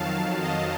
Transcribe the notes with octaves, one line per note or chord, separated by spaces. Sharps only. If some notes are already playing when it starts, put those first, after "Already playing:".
Already playing: F2 D#3 F#3 F5 A5
D#5